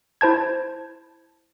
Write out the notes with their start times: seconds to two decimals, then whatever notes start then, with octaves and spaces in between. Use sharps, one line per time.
0.21 E4 C5 A5 G#6